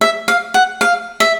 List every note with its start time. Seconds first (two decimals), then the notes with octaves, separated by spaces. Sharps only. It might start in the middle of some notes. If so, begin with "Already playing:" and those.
0.01 E5
0.28 F5
0.54 F#5
0.81 F5
1.20 E5